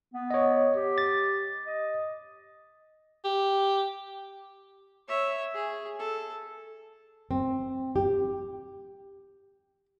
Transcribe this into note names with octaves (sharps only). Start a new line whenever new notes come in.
B3
C#5 D#5
G4
A6
D#5
G4
C#5 E5
G#4
A4
C4
G4